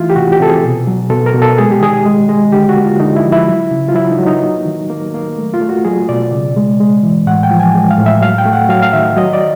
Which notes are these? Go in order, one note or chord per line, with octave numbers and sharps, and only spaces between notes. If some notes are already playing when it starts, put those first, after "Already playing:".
Already playing: E3 A3 E4 F4
G4
C3 F#4
G4
C3 A4
G#4
B2
F#3
B2 A4
A#4
B2
A4
G#3 G#4
G4
D#3 G#4
G#3
G#3
D3 G4
F#4
A#3
F4
D3 D#4
E4
F3
E4
F#3
C#3
F4
F#3 E4
D#4
F#3
D#4
A#3
D#3
A#3
A#3
A3
F4
A3
F#4
F#3 G#4
B2 D5
C#3
G#3
G#3
E3
A2 F#5
G5
F3
G#5
G#3
F5
A2
E5
F#3 F5
G5
A3
F#5
F#3 F5
F5
D#3 E5
F#3 D#5
D5